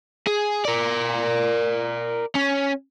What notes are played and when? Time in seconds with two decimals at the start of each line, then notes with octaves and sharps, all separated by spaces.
0.27 G#4
0.65 A#4 D5
2.35 C#4